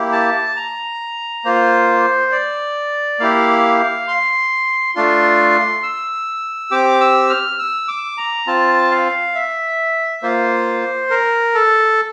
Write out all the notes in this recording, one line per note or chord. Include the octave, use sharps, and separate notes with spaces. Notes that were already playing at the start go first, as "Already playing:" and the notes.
Already playing: A#3 E4 G4
A5
A#5
A#3 F4 C5
D5
A#3 E4 G4 F5
C6
A3 D4 F4 C6
E6
C4 G4 D6
E6
F6
E6
D6
A#5
C4 F4 A5
F5
E5
A#3 F4 C5
A#4
A4